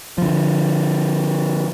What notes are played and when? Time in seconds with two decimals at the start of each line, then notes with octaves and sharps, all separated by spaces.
0.18 D3 F3